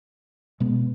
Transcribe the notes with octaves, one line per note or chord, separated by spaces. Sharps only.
B2 G#3 B3